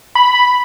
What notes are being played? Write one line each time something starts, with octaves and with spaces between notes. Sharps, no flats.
B5